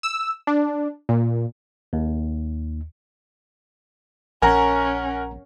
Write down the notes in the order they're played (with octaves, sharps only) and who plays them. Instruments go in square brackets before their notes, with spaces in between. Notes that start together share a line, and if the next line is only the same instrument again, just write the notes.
[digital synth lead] E6
D4
A#2
[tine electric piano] D#2
[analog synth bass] A#1 [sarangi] C#4 [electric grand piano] A#4 F#5 [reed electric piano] G#5 A#5